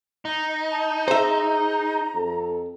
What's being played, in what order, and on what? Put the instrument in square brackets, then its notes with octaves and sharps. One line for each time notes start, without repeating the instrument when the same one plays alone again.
[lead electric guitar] D#4
[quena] A5
[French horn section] G#4 [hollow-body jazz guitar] C5 E5 [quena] A#5
[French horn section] F2 A4